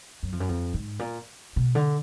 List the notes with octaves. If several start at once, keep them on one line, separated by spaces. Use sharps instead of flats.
F#2
F2
F#2
F2
G#2
A#2
B2
D3